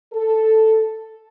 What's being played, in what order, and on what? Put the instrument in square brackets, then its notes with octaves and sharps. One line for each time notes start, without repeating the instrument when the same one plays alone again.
[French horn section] A4